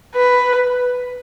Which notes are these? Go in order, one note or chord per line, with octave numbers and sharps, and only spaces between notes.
B4